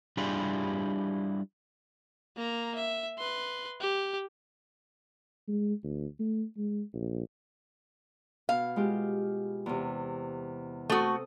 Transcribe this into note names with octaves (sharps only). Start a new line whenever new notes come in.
G3 D4 E4 F4 G4 G#4
A#3 A#5
E5
B4 C6
G4
G#3
D2
A3
G#3
A#1
B2 F5
G#3 F4 G4
E2 C3
A3 C4 F#4 A4 D#6